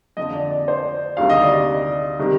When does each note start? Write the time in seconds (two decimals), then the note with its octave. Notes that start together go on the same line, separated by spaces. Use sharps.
0.17 F2 D3 F3 D#5
0.35 D5
0.50 D5
0.68 C5
1.17 D2 C3 D#3 G3 F5
1.30 D#5
1.41 D5
1.53 D#5
2.19 C3 D#3 G3